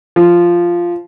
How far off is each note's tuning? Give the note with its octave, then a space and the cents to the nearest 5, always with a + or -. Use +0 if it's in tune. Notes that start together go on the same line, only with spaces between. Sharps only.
F3 -5